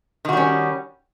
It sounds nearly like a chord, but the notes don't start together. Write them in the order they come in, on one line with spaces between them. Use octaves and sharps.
D#3 F#4 G3 C#4